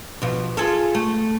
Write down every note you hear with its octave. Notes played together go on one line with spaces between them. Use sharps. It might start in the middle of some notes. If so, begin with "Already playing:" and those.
B2 F3
F4 G#4 A4
A3